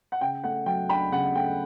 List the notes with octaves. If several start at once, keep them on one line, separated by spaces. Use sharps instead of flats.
F#5
C#3 G5
A3 F#5
F#3 G5
D4 G5 B5
C#3 F#5
A3 G5